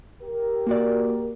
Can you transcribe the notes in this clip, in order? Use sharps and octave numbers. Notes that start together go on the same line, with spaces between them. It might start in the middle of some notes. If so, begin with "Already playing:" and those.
G4 A#4
A#3 F#4 D5